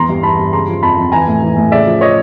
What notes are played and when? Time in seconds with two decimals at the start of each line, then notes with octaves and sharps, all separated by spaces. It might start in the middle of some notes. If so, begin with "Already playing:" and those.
Already playing: E2 E3 A#5 C6
0.09 G2
0.23 E3 A5 B5
0.39 G2
0.53 C#3 A#5 C6
0.68 F3
0.82 F2 A5 B5
0.97 F2
1.12 E3 G#5 A#5
1.28 A2
1.42 E3
1.56 A2
1.72 C#3 D5 E5
1.86 F3
2.01 C#5 D#5